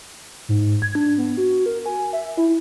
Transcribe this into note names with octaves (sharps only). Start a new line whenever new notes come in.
G#2
G#6
D4
B3
F#4
A#4
G#5
E5
E4